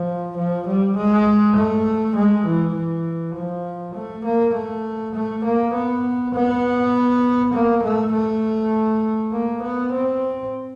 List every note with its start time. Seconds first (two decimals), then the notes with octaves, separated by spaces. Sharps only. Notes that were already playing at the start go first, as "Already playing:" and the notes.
Already playing: F3
0.37 F3
0.67 G3
0.96 G#3
1.56 A3
2.16 G#3
2.46 E3
2.76 E3
3.35 F3
3.95 A3
4.25 A#3
4.54 A3
5.15 A3
5.44 A#3
5.74 B3
6.34 B3
7.54 A#3
7.83 A3
8.13 A3
9.32 A#3
9.62 B3
9.92 C4